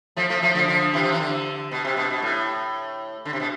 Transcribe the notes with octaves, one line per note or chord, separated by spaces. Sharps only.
F3 A3
F3 A3
F3 A3
D3 F3
D3 F3
C3 E3
F3
E3
D3
B2
C3
B2
B2
A2
D3
C3
B2